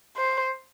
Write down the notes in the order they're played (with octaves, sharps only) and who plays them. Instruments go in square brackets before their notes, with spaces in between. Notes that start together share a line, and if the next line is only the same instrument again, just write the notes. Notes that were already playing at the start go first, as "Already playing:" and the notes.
[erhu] C5